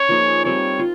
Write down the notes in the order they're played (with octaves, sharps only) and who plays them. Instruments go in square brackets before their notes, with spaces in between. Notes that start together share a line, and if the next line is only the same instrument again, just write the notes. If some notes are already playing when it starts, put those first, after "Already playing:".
Already playing: [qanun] C#4 [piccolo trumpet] C#5
[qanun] F3 A#3 D#4 G#4
[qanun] G3 C4 F4 [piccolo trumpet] C#5
[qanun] F4